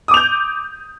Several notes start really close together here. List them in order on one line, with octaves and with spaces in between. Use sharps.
D#6 D6 F7 G6